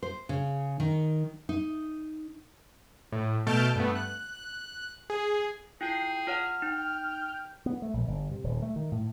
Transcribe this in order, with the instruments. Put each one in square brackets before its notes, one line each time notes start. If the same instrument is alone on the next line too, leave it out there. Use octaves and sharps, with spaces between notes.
[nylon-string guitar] C5
C#3
D#3
D#4
[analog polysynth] A2
B2 A3 A5 F6 G6 D7
G2 A3 B3
F#6
G#4
[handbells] E4 F4 C7 [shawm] G#4 [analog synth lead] G5
[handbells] F4 C#5 F#5 [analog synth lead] F6
[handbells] D#4 [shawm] G5
[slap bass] B3
A3
A#1
G1
C3
D#1
A3
D#3
A2